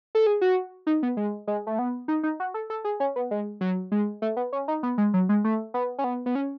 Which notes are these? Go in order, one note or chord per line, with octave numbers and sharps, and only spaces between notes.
A4
G#4
F#4
D#4
B3
G#3
G#3
A3
B3
D#4
D#4
F#4
A4
A4
G#4
C#4
B3
G#3
F#3
G#3
A3
B3
C#4
D#4
B3
G#3
F#3
G#3
A3
B3
C#4
B3
B3
C#4